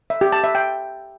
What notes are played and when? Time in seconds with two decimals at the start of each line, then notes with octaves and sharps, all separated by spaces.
0.10 E5
0.21 G4
0.32 A5
0.44 E5
0.55 G5